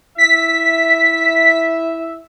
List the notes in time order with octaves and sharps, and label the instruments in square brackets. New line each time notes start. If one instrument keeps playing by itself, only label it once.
[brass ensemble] E4 E5 [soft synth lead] B6